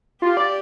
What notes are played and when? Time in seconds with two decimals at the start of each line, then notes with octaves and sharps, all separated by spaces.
0.22 F4 G4
0.37 D5